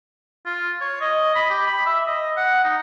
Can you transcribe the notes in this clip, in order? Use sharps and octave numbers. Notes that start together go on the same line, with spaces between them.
F4
C#5
D#5
B5
G4
B5
E5
D#5
F#5
D#4